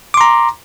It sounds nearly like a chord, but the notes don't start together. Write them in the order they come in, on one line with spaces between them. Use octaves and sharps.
D6 C6 A#5